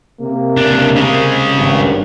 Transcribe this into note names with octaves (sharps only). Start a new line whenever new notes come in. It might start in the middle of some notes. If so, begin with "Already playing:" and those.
C3 A#3
C#2 D4
C#3 G#3
G#1 G2